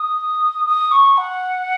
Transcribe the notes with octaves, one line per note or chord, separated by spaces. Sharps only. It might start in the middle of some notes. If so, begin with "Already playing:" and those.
Already playing: D#6
D#6
C#6
F#5